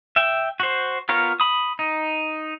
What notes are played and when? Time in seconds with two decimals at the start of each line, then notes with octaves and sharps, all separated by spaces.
0.16 E5 G5
0.60 F#4 C5
1.09 B3 F4 A#4 C#5
1.40 B5 D#6
1.79 D#4